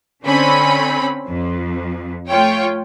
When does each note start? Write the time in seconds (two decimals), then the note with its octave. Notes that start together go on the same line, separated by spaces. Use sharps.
0.24 D3 C4 C#4 B5
1.28 F2
2.29 A3 F4 C#5 G5